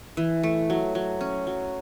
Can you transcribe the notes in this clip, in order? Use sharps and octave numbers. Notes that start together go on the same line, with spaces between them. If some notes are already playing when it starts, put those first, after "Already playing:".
E3
A3
F#3
F#3
C#4
F#3